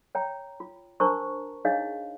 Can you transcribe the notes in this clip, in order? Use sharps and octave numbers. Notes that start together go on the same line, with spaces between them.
C#5 G5 A#5
F4
D4 A#4 C5 A5 A#5 C#6
D4 D#4 G#4 C#5 D#5 F5